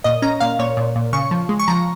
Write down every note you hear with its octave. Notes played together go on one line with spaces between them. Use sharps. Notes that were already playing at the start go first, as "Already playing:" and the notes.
A#2 D#5
C#4 A#5
A#2 F5
A#2 C#5
A#2
A#2
C#3 C#6
F3
G#3
C#6
F3 A#5